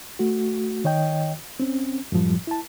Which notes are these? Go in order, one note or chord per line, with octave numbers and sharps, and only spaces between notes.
A3 F#4
D#3 C#5 D#5 G5
C4 C#4
F#2 A2 F3 G3
E4 A5